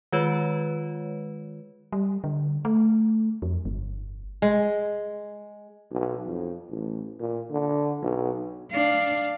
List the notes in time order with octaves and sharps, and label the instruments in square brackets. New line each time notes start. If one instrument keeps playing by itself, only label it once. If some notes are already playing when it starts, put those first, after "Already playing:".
[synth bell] D#3 G#3 F4 B4 C#5
[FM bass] G3
D3
A3
F2
G1
[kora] G#3
[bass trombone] B1
F2
A1
A#2
D3
B1
[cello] D4 F5